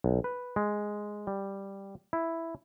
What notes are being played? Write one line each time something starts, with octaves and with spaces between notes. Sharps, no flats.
B1
B4
G#3
G3
E4